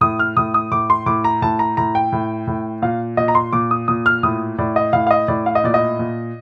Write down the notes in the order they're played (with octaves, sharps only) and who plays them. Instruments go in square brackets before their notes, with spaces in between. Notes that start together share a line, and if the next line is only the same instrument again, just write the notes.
[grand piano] A2 D#6
F6
A2 D#6
D#6
A2 D6
C6
A2 D6
A#5
A2 A5
A#5
A2 A#5
G5
A2
A2
A#2 F5
A#2 D#5
A#5
C6
A#2 D6
D#6
A#2 D#6
F6
A2 D#6
A2 D5
D#5
A2 F5
F5
D#5
A2 D5
F5
D#5
A#2 D5
D#5
A#2